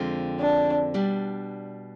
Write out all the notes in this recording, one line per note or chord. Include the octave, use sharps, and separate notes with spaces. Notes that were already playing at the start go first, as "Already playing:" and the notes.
Already playing: F2 D3 G#3 C4 F4
D4
B2 G3 D4